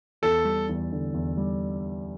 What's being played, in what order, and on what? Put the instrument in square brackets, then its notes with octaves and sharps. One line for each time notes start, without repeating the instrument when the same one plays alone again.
[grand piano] E2 [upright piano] A4
[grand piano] G3
E2
D3
E2
G3